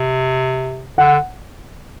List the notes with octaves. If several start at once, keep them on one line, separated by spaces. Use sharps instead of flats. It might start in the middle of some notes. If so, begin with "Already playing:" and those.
Already playing: C3
D3 F#5